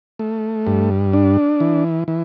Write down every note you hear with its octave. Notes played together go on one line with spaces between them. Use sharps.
A3
G2
D4
E3
E3